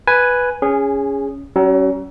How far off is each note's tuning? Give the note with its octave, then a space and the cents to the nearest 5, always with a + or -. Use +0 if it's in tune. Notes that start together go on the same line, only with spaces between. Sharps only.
B4 +0 G#5 +0
C#4 +10 G#4 -15
F#3 +35 C#4 +0